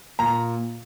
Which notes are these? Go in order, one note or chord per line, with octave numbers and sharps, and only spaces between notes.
A#2 A#5